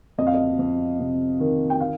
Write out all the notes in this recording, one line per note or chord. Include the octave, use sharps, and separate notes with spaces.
F2 D#5
F5
D#5
F2
C3
D#3
G5
F5